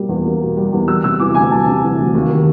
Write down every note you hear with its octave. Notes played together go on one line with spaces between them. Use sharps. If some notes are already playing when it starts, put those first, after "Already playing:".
Already playing: B2 G3 A#3
E2
A#3
B2
G3
E2
G3 E6
C3 E6
E3 D6
D2 G#5
G3 A5
C3
E3
D2
D#2
D#3